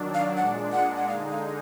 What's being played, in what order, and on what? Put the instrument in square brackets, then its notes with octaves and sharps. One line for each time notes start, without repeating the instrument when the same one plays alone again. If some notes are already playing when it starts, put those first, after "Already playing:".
Already playing: [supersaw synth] D#3 F#3 D4
[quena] F5
[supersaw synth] A#2 G#3 D4 [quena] F#5
[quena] F#5
F#5
[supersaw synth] D3 G#3 D#4 [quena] F5
[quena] F5